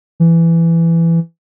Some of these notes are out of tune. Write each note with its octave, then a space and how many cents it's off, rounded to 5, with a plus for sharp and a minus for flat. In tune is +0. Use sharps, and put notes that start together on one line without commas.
E3 +15